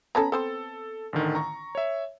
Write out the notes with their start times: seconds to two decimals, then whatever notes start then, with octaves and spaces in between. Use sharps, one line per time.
0.15 B3 C#4 A4 A#5 B5
0.32 B3 C4 A4 C5
1.13 A1 D3 D#3
1.35 A#5 C#6
1.75 C#5 E5